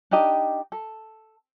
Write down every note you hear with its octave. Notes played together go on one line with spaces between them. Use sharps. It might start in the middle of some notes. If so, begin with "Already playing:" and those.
D4 D#4 G4 D#5
A4